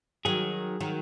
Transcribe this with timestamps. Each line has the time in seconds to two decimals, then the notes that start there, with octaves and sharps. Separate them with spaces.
0.25 D#3 F#3 G#4
0.81 D#3 F#3